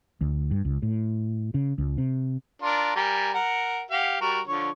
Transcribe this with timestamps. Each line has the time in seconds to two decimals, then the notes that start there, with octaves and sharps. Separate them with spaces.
0.21 D2
0.51 G2
0.65 C#2
0.82 A2
1.54 C#3
1.78 C#2
1.98 C3
2.62 D4 F4 A#4
2.96 G3 A#4 G#5
3.34 A#4 F#5
3.91 G4 F5 F#5
4.21 G3 F#4 A#4
4.47 D3 F3 C#5